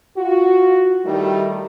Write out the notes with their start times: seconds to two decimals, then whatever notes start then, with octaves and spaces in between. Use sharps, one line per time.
0.16 F4 F#4
1.05 D#3 G3 A3 D#4 E4